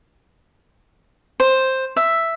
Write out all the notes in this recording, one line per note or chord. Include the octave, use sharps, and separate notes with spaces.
C5
E5